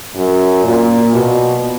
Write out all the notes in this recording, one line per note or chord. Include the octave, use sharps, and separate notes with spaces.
F#2
A#2
B2